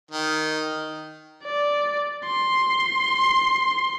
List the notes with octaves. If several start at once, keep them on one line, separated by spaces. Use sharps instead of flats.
D#3
D5
C6